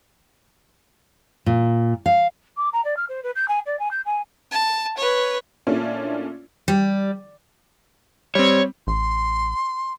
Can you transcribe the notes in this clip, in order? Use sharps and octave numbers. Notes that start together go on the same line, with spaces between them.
A#2
F5
D6
A#5
D5
F6
C5
B4
G6
G#5
D5
G#5
G6
G#5
A5
B4 C#5
A#2 A3 C#4 D4 E4 F4
G3
G3 C4 C#5
A1 C6